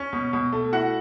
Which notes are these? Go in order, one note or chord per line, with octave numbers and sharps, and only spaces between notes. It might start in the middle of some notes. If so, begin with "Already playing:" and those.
Already playing: C#4
B2
B2
A3
E4 F#4 F#5